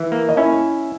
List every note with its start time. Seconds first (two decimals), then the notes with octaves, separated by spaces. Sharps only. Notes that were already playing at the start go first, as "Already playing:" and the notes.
Already playing: E3
0.12 A#3
0.29 D#5
0.37 C#4 E4 E5